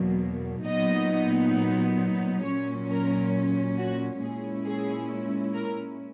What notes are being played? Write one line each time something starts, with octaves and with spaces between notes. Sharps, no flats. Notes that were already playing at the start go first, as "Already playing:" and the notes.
Already playing: E2 B2 F#3 A#3
A#2 F#3 B3 D#4 D#5
A#2 F#3 C#4 C#5
A#4
F#4
A#2 G#3 C#4 E4 G#4
G#4
A#4